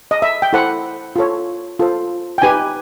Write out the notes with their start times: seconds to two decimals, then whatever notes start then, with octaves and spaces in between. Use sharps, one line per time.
0.11 D#5
0.22 E5
0.42 G5
0.53 E4 A4 C5 F#5
1.16 F4 A4 C#5
1.79 F4 A4 C5
2.38 G5
2.42 D#4 G4 B4 G#5